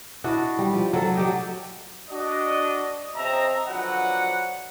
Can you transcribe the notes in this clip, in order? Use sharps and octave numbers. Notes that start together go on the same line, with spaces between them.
D4 E4 F#4 D#5
G3
F3
F#3 A4
F#3 G4 D#5
D4 F#4 D#5
C#3 C4 D#5 E5 A5 A#5
D3 F3 F#3 B4 F#5